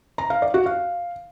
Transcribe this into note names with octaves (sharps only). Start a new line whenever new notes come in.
A#5
F5
D5
F#4
F5